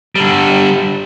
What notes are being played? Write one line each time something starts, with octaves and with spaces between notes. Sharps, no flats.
D3 G3